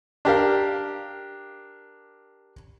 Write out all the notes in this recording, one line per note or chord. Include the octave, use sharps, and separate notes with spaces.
D4 G4 A#4 F5